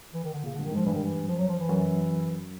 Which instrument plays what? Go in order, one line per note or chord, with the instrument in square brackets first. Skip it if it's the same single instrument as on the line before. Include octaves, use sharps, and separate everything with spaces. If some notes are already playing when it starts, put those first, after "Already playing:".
[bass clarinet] E3
D#3
D3
[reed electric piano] A#2 [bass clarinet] C#3
[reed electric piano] G2 [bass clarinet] D3
[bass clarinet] D#3
[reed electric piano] G#2 [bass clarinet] F3
[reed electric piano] G2 [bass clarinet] E3
[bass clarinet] D#3
E3
[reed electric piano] F#2 [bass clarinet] F3
[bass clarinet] F#3
F3
E3
[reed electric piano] F#2